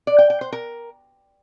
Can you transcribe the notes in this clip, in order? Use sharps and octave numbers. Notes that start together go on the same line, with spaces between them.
D5
G5
G5
C5
A#4